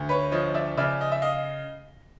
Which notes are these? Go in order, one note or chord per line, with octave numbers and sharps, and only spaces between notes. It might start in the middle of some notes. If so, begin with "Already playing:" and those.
Already playing: D2
B4 C#5
F3 C#5 D#5
D5 E5
C#3 D5 E5
D#5
E5
D#5 F5